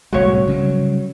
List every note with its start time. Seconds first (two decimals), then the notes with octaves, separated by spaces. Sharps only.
0.13 D1 C2 G#3 F#4 C#5
0.47 C#3 F#3 G3